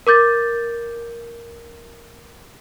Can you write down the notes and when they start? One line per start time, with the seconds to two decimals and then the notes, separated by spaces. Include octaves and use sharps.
0.07 A#4 D6 G6 A6